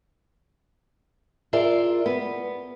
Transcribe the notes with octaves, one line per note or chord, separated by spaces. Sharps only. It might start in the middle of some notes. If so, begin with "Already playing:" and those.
F4 G#4 A#4 D5 E5
B3